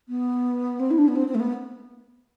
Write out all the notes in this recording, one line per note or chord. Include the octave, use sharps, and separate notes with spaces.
B3
C4
E4
D4
B3
C4
C4
A3
B3